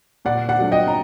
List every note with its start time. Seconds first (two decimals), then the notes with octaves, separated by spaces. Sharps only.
0.25 A#2 D5 F#5
0.49 D5 F#5
0.59 F#3 A3 D4
0.72 D#5 G5
0.88 A#5